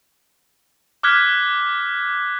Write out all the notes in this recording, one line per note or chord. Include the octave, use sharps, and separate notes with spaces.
D6 F6 F#6 G#6 B6